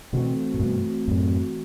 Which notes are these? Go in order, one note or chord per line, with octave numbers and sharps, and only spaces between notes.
B2 D3 E3 A3 C4 F#4
A2
G2 B2
F#2 A2